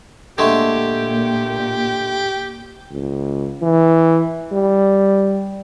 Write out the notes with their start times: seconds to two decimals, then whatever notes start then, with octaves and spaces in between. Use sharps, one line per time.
0.38 A#2 D3 G#3 A3 G4
2.91 C#2
3.62 E3
4.53 G3